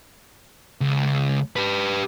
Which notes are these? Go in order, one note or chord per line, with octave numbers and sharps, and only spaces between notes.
C#2
G4 B4